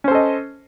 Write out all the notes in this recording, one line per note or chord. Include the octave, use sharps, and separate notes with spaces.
C#4 A4 C5 D#5